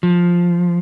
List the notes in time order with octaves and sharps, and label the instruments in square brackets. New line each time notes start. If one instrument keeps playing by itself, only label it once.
[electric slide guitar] F3